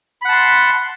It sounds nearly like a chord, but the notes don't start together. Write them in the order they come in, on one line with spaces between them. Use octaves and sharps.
B5 F#5 A5 C6